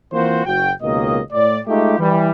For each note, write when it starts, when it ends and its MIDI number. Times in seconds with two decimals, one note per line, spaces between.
0.13 0.43 52
0.13 0.43 58
0.13 0.43 60
0.13 0.43 65
0.13 0.43 66
0.13 0.43 72
0.46 0.72 30
0.46 0.72 66
0.46 0.72 79
0.83 1.20 37
0.83 1.20 47
0.83 1.20 51
0.83 1.20 58
0.83 1.20 75
1.32 1.59 45
1.32 1.59 74
1.67 1.95 56
1.67 1.95 57
1.67 1.95 63
1.67 1.95 65
1.67 1.95 67
1.99 2.31 52
1.99 2.31 55